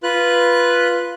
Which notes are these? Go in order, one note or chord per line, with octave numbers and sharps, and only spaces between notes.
F4 B4 F#6